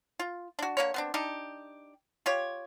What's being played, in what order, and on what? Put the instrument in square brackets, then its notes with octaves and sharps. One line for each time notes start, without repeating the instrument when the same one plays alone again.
[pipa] F4
D4 F#4
D3 A#3 C#5
B3 C4 D4
D4 D#4 G4
F4 G4 C#5